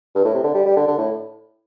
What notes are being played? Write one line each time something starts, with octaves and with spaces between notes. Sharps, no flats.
G2
A2
C3
D3
G3
G3
D3
D3
A2